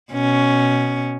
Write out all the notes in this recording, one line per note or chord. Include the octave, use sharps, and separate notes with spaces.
B2 C#4